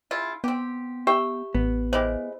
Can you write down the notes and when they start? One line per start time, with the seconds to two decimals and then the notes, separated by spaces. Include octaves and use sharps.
0.11 C#3 E4 F4
0.44 B3 C4 G4
1.07 G4 E5 G5
1.55 A1 B3
1.93 G#3 E4 G4 C5